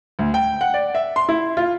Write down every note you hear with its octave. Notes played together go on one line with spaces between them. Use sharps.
D2
G5
F#5
D5
E5
C6
E4
F4